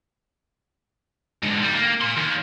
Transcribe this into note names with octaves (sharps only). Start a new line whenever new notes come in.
G#2 D3
G3
A#3
A#4 C6
D#2